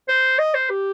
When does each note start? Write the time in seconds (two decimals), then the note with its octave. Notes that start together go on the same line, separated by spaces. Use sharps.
0.08 C5
0.39 D#5
0.54 C5
0.70 G4